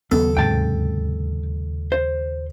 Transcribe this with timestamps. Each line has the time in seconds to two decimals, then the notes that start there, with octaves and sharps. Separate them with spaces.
0.11 D#2 C#3 F#3 B3 A4
0.37 D2 G#2 C3 G5 A5
1.92 C5